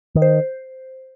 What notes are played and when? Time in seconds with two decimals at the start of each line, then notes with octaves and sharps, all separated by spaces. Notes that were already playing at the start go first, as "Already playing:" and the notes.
0.15 D#3
0.22 C5